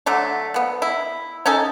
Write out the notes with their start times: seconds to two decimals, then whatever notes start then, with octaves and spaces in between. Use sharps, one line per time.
0.06 D3 F#3 A3
0.54 F3 B3
0.82 E4
1.46 C#4 D#4 A4 G#5